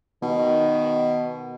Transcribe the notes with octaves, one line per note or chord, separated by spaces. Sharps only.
B2 D#3